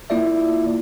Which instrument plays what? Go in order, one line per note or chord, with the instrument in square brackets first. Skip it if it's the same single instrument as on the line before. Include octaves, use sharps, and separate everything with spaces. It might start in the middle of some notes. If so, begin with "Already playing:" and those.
[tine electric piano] A#3 E4 F4 D5 E5